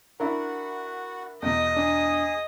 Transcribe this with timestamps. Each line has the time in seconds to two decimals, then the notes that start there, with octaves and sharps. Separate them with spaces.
0.20 D4 E4 F#4 A#4 F#5
1.42 E2 B2 D#5 G5
1.77 D4 G#4 D#6